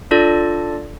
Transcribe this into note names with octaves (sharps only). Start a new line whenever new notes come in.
D4 F4 A4 D5